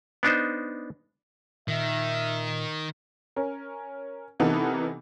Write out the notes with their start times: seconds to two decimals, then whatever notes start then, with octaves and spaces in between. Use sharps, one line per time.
0.23 B3 D4 D#4 C5
1.68 A#2 D#3 E5
3.36 C#4 A#4
4.40 C3 E3 B3 D#4 A4 A#4